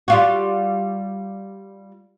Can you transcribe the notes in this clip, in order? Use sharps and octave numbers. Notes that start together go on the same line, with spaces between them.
G3 F4 F#4